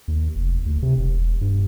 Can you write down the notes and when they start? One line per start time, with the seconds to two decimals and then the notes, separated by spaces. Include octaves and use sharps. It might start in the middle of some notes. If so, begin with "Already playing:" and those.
0.08 D#2
0.36 F1
0.66 D2
0.82 C3
0.98 E1
1.41 G2